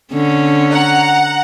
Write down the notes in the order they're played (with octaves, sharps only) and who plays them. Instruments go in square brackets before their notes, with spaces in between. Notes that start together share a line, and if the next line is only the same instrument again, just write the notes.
[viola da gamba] D3 C#4
[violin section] F#5 A#5